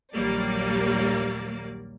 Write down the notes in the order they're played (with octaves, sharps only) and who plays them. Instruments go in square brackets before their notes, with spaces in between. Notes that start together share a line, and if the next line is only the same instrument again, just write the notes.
[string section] A#1 D#2 F#3 G3 A#3 D5